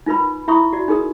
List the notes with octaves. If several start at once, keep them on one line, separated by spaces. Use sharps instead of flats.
D#4 F4 A#4 B4 B5
E4 E5 B5 C#6 D#6
F#4 D5
D#4 G#4 A#4 D#6